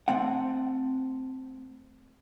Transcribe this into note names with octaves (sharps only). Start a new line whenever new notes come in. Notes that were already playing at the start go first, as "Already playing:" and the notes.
A3 C4 F#5